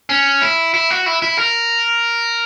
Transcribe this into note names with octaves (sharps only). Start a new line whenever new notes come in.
C#4
E4
E4
F#4
E4
E4
A#4